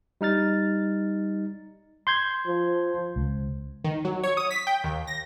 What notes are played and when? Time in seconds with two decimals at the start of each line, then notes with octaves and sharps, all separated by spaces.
0.21 G3 D#4 F6 A6
2.07 C6 G6 G#6
2.47 F3
3.16 C#2
3.84 D#3
4.05 F#3
4.23 C#5
4.37 D#6
4.51 B6
4.67 G5
4.84 D#2
5.07 A#6